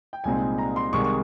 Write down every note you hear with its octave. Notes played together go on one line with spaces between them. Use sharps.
G5
C2 A#2 G#3 C4 D#4 G#5
A#5
C6
C2 C3 D#3 G#3 C#6
C#6